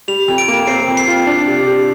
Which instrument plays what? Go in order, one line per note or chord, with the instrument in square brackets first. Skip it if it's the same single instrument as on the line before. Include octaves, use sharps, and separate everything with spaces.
[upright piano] G3 [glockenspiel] F7
[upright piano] F2
[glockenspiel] D7
[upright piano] A#3
[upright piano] C4 [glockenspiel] C7
[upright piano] F2
[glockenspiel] C7
[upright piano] F4
D4
C3
G4